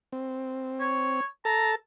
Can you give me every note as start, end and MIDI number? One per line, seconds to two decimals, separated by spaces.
0.12 1.21 60
0.80 1.25 73
1.45 1.75 69
1.45 1.75 81
1.45 1.71 82